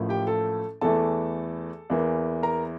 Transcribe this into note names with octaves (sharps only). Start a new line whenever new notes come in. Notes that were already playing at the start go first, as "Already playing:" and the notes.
Already playing: A1 A2 F3 A#3
G4 G5
A4 A5
E2 E3 A3 A4 A5
E2 E3 A#3
A#4 A#5